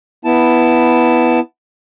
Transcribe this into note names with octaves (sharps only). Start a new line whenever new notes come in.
B3 E4 A5